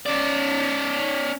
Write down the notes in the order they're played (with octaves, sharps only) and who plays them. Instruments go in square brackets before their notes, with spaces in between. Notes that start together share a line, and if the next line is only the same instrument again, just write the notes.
[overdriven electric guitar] C#4 D5